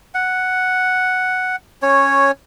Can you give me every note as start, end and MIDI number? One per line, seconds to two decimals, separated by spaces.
0.14 1.56 78
1.82 2.31 61
1.82 2.31 73